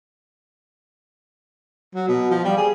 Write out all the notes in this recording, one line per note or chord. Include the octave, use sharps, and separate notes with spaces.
F#3
B2
F3
G3
G#4